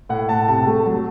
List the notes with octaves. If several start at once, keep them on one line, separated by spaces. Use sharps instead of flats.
A2 F#5
A2 A5
C3 A5
A3
F#3